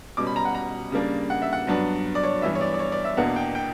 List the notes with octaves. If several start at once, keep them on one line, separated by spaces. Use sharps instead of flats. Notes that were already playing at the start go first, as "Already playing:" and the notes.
B2 G3 C#4 D6
B5
A#5
F#5
A#5
C#3 G3 A#3 D4
F#5
E5
F#5
G2 F#3 B3 D4
D5
C#5
G2 E3 B3 E5
C#5
D5
D5
C#5
D5
E5
E2 B2 A#3 D4 F#5
G5
G5